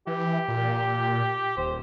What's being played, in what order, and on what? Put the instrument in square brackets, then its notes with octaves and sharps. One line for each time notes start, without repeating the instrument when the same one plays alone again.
[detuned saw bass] E3 [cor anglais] G4
[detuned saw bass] A#2
[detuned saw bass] D#1 [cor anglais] C5